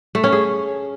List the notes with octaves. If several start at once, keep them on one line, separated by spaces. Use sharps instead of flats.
A3
C#4
G#4